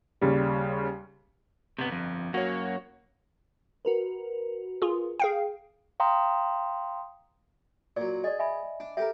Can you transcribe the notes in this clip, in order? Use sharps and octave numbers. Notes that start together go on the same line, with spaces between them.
D#2 C#3 G3
G1 C3 B3
F2
F#2 A#3 F#4 C#5
F#4 A#4 B4
F4 G#4
G#4 F5 G5
F5 G5 A#5 C6 D#6
A#2 F#3 D5
G#4 D5 D#5
E5 G#5 B5
D4
G4 A4 A#4 E5